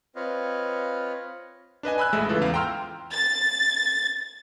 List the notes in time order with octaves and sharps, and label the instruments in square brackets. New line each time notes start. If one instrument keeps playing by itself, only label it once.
[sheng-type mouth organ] C4 F4 B4 C#5 D#5 F5
[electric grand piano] D4 B4 D#5 G#5
G#5 B5 E6 F#6
A1 G#3 A3 E5 E6
C#3 E3 F4 A4 B4
E2 F5
G5 A#5 C6 E6 F6
[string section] A6